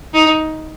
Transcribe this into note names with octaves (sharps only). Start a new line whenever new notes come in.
D#4